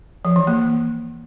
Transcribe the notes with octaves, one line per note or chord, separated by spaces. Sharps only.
F3
E3
A#3